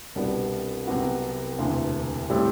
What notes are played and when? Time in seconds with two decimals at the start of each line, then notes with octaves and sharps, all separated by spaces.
0.15 C2 B2 G3 B3 D4
0.87 C2 C3 F#3 B3 F#4
1.59 E1 D2 C3 E3
2.30 A2 G3 C4